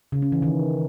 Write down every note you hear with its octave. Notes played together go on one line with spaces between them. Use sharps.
C#3
C#4
E3
D#3